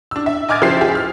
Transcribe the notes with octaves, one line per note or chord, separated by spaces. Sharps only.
D4 E6
E5
D#5 G#5 D6 F6 G#6 A6
C#3 F3 E4 G4 C5 C7
G4 G#4
F6